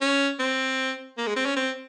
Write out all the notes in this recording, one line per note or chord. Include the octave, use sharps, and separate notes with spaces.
C#4
C4
A#3
G#3
C4
C#4
C4